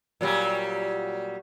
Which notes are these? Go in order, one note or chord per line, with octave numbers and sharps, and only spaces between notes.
A#2 F#3 G3